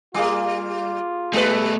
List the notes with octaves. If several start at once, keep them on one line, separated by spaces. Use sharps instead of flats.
G3 A#3 F4 G#4 D6
B2 G3 A3 B4